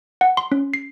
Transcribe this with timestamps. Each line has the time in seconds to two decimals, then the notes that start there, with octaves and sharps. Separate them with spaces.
0.21 F#5
0.37 C6
0.52 C#4
0.74 C7